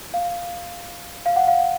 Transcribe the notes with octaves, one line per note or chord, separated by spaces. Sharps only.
F5
F5
F#5
F5